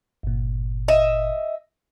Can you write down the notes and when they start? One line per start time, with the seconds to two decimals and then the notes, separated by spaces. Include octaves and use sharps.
0.23 G1 A#2
0.88 D#5 E5